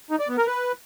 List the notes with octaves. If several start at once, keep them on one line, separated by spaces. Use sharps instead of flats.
D#4
D5
B3
A#4
B4